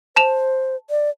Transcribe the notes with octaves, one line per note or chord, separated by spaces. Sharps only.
C5 A5 E7 F7
D5